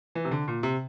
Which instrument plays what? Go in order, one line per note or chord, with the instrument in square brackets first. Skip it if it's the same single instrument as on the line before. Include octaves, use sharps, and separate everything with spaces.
[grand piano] E3
C3
D3
A#2
C3